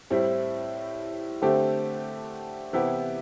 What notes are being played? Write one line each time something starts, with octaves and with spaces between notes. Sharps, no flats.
A2 G3 C4 E4
D3 A3 C4 G4
C3 E3 B3 E4 G4